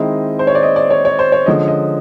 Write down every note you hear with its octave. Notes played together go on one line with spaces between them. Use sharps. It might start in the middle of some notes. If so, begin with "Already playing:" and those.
Already playing: D#3 G#3 C4 E4 D#5
C5
C#5
D5
D#5
D5
C#5
C#5
C5
C#5
D3 F3 G#3 C#4 D#5
D#5